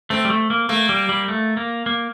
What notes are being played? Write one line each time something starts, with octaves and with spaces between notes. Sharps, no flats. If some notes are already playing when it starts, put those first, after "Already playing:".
A3 C4
G3
A3
A#3
A3 A#3
G3
G3
A3
A#3
A#3